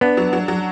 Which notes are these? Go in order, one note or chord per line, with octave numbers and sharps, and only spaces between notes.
B3 D4
F#3
F#3
F#3